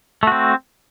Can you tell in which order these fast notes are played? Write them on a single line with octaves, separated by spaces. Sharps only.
A3 F#4 C4